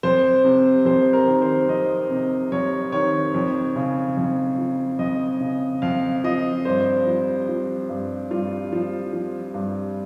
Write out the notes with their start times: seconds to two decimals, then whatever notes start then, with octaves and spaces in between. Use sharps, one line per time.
0.03 F2 C5
0.44 C3
0.85 F2 C5
1.13 A#4
1.27 D#3
1.42 C5
1.68 F2 D#5
2.10 C3
2.52 F2 C#5
2.92 D#3 C#5
3.34 F2
3.76 C#3
4.17 F2
4.58 F3
4.99 F2 D#5
5.40 C#3
5.82 F2 F5
6.24 F3 D#5
6.65 G2 C5
7.07 F3
7.48 F3
7.89 G2
8.31 G2 F4
8.73 F3
9.13 F3
9.54 G2